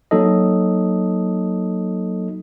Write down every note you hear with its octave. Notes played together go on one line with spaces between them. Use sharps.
F#3 A#3 D#4 A4 D#5